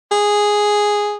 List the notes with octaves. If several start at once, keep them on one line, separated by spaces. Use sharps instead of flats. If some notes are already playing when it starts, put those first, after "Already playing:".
G#4